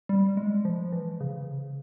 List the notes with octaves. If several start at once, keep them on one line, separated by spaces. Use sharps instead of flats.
G3
G#3
F3
E3
C#3